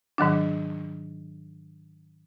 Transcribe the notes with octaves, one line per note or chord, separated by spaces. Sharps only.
G#2 D#3 F#3 D4